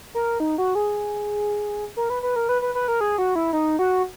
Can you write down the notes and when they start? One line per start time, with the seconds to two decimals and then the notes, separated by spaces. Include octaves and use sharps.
0.15 A#4
0.40 D#4
0.58 F#4
0.75 G#4
1.97 A#4
2.10 B4
2.23 B4
2.36 A#4
2.49 B4
2.62 B4
2.75 B4
2.88 A#4
3.01 G#4
3.18 F#4
3.35 E4
3.53 D#4
3.79 F#4